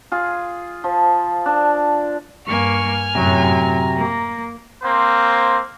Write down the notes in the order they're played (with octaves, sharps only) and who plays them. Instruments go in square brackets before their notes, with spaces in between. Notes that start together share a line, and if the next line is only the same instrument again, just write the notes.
[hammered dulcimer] F4 G#4
F3
D4 A5
[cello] G2 A#3 [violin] G#5 F6 [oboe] C#6
[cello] F#2 A2 [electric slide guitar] C3 F#3 [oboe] A#5
[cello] A#3
[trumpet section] A#3 C4 C5